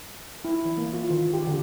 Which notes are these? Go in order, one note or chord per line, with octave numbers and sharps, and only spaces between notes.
E4
E3
A#3
F4
D#3
G4
D3